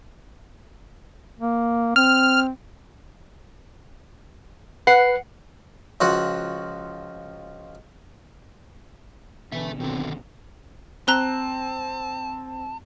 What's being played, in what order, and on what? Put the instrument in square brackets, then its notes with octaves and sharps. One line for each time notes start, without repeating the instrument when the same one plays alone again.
[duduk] A#3
[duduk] C4 [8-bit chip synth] F6
[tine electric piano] B4 C7 [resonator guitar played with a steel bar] F#5
[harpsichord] C#2 F3 F#4 F#5
[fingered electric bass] B2 D3 [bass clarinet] E3 [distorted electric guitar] A4 E5
[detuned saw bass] B1 [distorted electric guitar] D#3 A4 [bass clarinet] C4
[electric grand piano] C4 [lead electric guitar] A5 [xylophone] A#5 F#6 G7